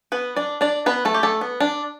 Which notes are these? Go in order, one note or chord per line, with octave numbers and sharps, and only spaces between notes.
B3 B4
D4 D5
D4 D5
B3 B4
A3 A4
G4
A3 A4
B3
D4